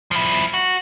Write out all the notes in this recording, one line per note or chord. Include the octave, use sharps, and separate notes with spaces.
F3 E4
F#4